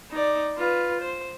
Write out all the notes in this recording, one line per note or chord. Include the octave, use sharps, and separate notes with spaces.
D#4 D5
F4 B4
C5